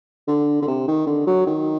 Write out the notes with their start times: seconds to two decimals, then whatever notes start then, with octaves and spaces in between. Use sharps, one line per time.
0.28 D3
0.62 D3
0.67 C3
0.88 D#3
1.07 D3
1.26 F#3
1.47 D#3